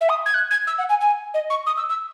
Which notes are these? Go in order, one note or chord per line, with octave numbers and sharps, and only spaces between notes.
E5
D#6
G#6
F#6
G#6
E6
F#5
G#5
G#5
D#5
C#6
D#6
E6
E6